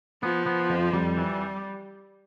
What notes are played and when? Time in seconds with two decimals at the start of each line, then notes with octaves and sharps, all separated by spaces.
0.23 F3 B3
0.46 B3
0.70 F2
0.93 F2 G3
1.17 E3